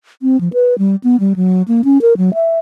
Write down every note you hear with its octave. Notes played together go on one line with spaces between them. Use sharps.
C4
F3
B4
G3
B3
G3
F#3
A#3
C#4
A#4
F#3
E5